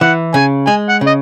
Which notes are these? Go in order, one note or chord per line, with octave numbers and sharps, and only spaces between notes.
E3 F#5
C#3 G#5
G#3 G#5
F#5
C#3
D#5